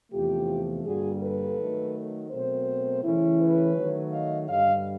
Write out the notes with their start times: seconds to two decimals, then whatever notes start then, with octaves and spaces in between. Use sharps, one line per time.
0.12 E2 C3 F3 A3 F4 G4
0.85 G2 D3 G3 A#3 F#4 G#4
1.21 A4 B4
1.58 D#3 F#3 A3
2.31 B2 F#3 A3 C4 A#4 C5
3.03 C#3 E3 A3 C#4 E4
3.40 B4 C#5
3.76 D#3 F#3 A3
4.12 D#5 F5
4.49 G2 D3 G3 D#5 F5